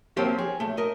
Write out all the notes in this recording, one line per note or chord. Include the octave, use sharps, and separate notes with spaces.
B2 F3 F#3 A#3 C4 G4
G#4
B1 A3
A#4 D#5